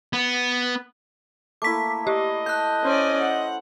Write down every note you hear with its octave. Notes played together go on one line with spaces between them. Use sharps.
B3
A3 A#3 E4 D6 B6
G4 D5 D#5
A5 F#6 G6
C#4 C5 D5 G#5
E5 F#5